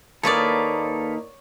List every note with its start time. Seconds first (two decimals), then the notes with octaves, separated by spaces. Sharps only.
0.23 D#2 A#3 D#4 A4 B4 C#5 D5 F5